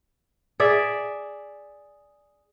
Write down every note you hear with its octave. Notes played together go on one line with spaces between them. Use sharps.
G#4 D5 E5